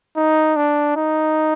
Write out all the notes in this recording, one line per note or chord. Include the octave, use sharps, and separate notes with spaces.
D#4
D4
D#4